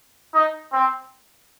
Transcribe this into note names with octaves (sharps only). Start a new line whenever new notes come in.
D#4
C4